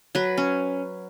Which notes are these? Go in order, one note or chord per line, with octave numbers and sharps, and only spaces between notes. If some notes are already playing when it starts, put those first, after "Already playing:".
F#3 B4
C#4